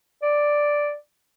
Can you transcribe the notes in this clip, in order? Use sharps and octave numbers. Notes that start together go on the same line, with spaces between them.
D5